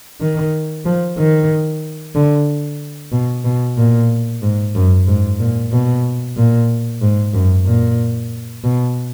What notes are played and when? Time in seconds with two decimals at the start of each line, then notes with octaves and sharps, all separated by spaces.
0.21 D#3
0.85 F3
1.18 D#3
2.15 D3
3.12 B2
3.45 B2
3.77 A#2
4.42 G#2
4.75 F#2
5.07 G#2
5.39 A#2
5.72 B2
6.37 A#2
7.02 G#2
7.33 F#2
7.66 A#2
8.64 B2